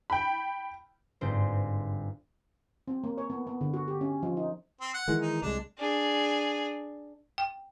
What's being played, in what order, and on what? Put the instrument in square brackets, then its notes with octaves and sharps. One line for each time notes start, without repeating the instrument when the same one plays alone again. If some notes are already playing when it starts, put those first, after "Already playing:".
[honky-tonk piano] G5 B5
[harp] G1 G#2 C4 C5
[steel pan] C4
A#3
C#5
B3
B3
D3
F#4
G4
C#4
F3
D#4
[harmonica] C4
F#5
[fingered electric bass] D#3 E3 G#3
[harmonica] D#4
[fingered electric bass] C2 G3 G#3 [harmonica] D4
[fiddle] D4 G#4
[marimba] G5